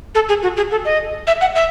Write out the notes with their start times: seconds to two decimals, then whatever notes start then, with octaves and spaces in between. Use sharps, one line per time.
0.15 A4
0.29 G#4
0.43 F#4
0.57 G#4
0.71 A4
0.85 D#5
1.27 E5
1.41 F#5
1.55 E5